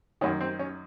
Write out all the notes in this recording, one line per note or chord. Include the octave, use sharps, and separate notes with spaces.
F#2 D#3 C#4
C4
C#4